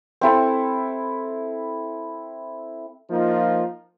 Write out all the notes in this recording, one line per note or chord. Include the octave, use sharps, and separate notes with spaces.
C4 E4 A4
F3 A#3 D#4 F4